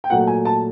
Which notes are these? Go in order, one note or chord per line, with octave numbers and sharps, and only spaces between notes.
G5
A#2 F#3 A3 F#5
G#5
A5